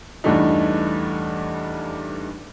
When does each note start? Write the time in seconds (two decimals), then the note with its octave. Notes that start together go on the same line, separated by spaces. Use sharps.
0.24 E2 G2 E3 A3 D4 D#4